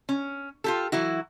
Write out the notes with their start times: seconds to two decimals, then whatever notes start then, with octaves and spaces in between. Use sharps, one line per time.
0.09 C#4
0.64 F4 G4 A4
0.92 E3 F#3 E4 F#4